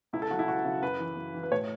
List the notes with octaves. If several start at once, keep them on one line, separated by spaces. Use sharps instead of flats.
C#2 E4
A4
C#3 F#3 F#4
E4
C#2 F#4
C#3 F#3
F#2 B4
E3
F#2
E3
B4
A2 C#5